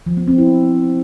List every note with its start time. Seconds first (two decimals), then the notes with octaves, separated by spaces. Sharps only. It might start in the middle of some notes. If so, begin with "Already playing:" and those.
0.06 F3
0.17 B3
0.27 C4
0.38 E4
0.48 B3